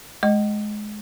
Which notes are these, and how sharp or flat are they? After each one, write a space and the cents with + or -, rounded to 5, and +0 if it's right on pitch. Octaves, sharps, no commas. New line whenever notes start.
G#3 +20 D#5 -15